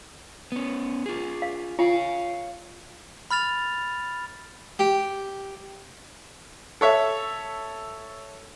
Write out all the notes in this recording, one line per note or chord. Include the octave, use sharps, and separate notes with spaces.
B3 C#4
F4 G#4
F5
F4 C#5 F5
B5 F6 A6 F7
G4
A4 C#5 E5